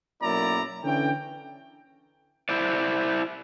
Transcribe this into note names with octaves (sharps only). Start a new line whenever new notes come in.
B1 F#2 A#3 E4 D5 A#5
D3 E3 C#4 G5
E4 C5 D5